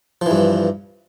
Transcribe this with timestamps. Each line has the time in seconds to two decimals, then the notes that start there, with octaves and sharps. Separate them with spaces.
0.21 F3
0.26 E3
0.31 G2